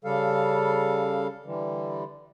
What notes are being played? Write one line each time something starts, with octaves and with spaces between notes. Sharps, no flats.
C#3 G3 A4 F5
D3 E3 G3